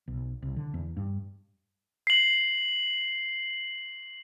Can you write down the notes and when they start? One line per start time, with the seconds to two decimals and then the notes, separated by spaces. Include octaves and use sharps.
0.08 B1
0.42 C2
0.56 D3
0.74 E2
0.97 G2
2.07 C7 F#7